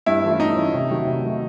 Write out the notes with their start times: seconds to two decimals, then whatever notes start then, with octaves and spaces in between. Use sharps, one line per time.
0.06 G2 E4
0.24 E3 A3 C#4 F4
0.40 G2 D#4
0.56 E3 A3 C#4 F4
0.74 C3
0.90 D#3 F#3 A3
1.06 C3
1.23 D#3 F#3 A3